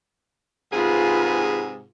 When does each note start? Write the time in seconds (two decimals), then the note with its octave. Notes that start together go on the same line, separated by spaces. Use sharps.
0.71 G#2 C3 F4 G#4 B4